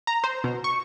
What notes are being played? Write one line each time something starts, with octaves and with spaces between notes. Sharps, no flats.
A#5
C5
B2
C#6